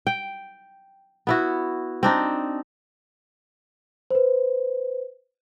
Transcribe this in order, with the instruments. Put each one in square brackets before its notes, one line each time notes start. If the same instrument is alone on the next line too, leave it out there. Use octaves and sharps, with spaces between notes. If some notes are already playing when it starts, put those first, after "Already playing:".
[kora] G5
B3 E4 F#4
C4 D4 D#4
[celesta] B4 C5